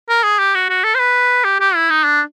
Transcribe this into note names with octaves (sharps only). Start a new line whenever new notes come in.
A#4
G#4
G4
F#4
F#4
A4
C5
B4
G4
G4
E4
D#4
D4